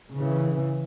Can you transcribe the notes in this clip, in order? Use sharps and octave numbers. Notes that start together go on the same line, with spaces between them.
C#3 E3